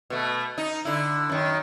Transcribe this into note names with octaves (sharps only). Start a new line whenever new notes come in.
B2 A3
D#4
D3 E4
F#2 D#3